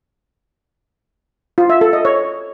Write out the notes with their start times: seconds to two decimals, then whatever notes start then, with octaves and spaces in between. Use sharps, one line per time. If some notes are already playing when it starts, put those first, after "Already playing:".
1.58 F4
1.70 E5
1.81 A4
1.93 D#5
2.05 C#5